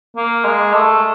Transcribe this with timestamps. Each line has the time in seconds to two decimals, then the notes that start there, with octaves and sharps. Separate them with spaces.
0.17 A#3
0.45 G#3
0.73 A3